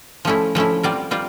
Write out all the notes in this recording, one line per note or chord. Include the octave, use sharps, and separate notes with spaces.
F3 A3 C#4 E4
F3 A3 C#4 E4
G3 C4 F4 A#4 D5
G3 C4 F4 A#4 D5